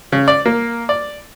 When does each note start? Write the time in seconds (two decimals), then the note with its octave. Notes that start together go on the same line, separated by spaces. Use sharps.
0.12 C#3
0.28 D5
0.46 A#3
0.89 D5